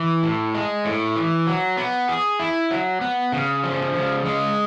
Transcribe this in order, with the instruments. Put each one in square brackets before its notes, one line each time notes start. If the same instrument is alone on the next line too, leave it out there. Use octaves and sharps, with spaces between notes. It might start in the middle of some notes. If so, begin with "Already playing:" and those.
Already playing: [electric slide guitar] E3
A2
G#3
A2
E3
F#3
B3
G#4
E4
F#3
B3
C#3
F3
C#3
G#3